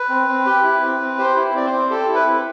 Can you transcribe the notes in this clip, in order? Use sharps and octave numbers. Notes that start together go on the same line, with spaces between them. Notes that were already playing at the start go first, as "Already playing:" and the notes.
Already playing: B4
C4
C4
G4
E4
C4
C4
G4 C5
E4
C4 D5
C5
C4
G4 A4
E4
B4
C4